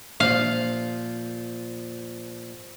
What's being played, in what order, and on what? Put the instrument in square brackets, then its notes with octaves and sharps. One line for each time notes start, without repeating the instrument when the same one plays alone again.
[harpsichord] A#2 F3 [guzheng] F5